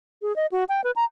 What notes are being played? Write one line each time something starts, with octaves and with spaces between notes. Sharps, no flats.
G#4
D#5
F#4
G5
B4
A#5